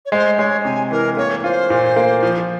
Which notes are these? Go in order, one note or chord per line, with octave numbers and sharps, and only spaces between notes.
C#5
G#3 C5
G#3 C#5
C3 G#5
E3 A#4
A#3 C#5
F4 C5
A#2
A#3
F3